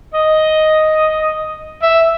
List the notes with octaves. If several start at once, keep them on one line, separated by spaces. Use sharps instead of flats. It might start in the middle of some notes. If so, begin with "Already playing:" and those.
D#5
E5